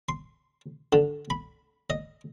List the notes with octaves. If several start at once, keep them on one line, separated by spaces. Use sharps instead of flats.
C6
D3
B5
D#5